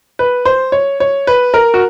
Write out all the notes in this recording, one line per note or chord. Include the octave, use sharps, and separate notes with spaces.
B4
C5
C#5
C#5
B4
A#4
F#4